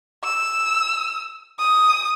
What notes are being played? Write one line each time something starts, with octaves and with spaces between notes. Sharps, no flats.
E6
D#6